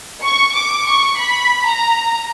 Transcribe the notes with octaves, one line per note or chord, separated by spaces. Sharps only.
C#6
D6
C#6
B5
A#5